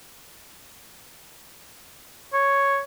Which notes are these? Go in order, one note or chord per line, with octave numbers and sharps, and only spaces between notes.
C#5